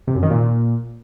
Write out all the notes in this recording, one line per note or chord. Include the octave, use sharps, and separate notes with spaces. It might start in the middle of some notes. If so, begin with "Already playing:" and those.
C3
F#2
D#3
A#2